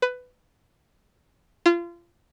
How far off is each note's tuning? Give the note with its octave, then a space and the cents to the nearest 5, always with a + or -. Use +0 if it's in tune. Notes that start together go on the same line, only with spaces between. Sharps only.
B4 +15
F4 -30